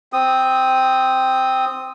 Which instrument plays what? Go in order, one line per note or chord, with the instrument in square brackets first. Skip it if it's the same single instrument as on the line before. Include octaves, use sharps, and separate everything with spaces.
[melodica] C4 D#6